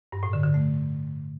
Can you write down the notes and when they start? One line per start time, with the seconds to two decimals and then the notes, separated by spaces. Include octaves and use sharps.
0.12 G2
0.23 A2
0.33 D3
0.44 D3
0.54 A3